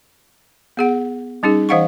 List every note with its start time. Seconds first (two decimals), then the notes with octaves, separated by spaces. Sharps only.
0.77 B3 G#4 F#5
1.43 G3 C#4 D#4 G#4
1.69 E3 C5 D#5 F5 F#5 C#6